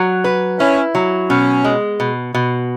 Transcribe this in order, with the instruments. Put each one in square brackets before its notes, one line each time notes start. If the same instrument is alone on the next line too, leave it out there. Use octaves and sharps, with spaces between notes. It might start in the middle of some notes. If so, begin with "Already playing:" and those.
Already playing: [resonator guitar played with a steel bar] F#3
B4
[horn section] C#4 [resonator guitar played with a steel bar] E4
[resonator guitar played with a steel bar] F#3
[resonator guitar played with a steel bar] B2 [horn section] C#4
[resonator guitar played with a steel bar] G#3
B2
B2